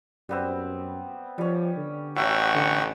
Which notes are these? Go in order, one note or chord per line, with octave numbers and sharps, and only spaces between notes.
F#2 G3 B3 C4
F3 G3 C#4
D3
A1 F#3 E5 F#5 G5 C#6
D3